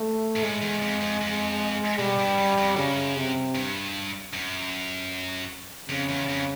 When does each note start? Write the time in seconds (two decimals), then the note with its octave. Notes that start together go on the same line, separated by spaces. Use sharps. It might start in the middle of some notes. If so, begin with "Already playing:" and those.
Already playing: A3
0.36 G#2
0.43 A2 G#3
0.62 E2
0.82 F2
1.01 F2
1.21 F2
1.99 B2 G3
2.19 G2
2.38 F#2
2.58 F2
2.77 F#2 C#3
3.16 C3
3.55 G2
4.33 F#2
5.89 F2 C#3
6.09 E2
6.29 F2